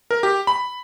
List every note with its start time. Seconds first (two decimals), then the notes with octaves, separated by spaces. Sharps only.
0.11 A#4
0.23 G4
0.47 B5